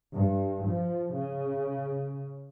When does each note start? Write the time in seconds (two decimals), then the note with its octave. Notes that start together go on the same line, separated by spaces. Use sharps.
0.11 G2
0.67 F3
1.15 C#3